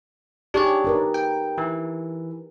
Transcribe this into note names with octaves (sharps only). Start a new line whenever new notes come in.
D4 D#4 G4 G#4 C#5 D5
D#4 A#4 B4
G5
E3